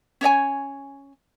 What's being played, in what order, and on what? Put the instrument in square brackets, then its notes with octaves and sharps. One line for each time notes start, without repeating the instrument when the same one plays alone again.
[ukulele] C#4 C#5 D5 G#5